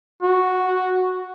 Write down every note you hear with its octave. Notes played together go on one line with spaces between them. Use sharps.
F#4